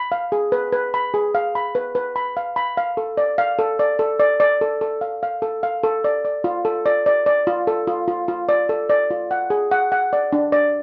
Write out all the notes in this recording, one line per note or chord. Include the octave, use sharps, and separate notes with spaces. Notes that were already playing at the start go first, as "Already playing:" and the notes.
Already playing: B5
F5
G#4
B4
B4
B5
G#4
F5
B5
B4
B4
B5
F5
B5
F5
A4
D5
F5
A4
D5
A4
D5
D5
A4
A4
F5
F5
A4
F5
A4
D5
D5
F4
A4
D5
D5
D5
F4
A4
F4
F4
F4
D5
A4
D5
F4
F#5
G#4
F#5
F#5
D5
D4
D5